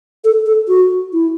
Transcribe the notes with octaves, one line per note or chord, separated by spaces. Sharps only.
A4
A4
F#4
E4